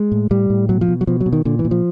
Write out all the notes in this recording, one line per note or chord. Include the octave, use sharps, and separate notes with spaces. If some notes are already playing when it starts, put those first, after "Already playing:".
Already playing: G#3
A2
A2 G3
A2
B2 F#3
F3
B2
F#3
B2 F3
F#3
B2
D#3
A#2 D3
E3
A#2
F3